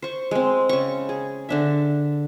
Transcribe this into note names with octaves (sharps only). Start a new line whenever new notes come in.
C5 C#6
G#3 C4
C#3 C#6
G#4
D3 D4 E5